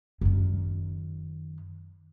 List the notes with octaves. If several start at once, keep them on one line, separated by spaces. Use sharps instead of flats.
F#2 D#3